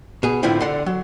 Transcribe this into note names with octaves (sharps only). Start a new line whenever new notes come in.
B2 G#4
A2 D3 F3 C4 E4 F4
D3 D4 F#5 C6
F#3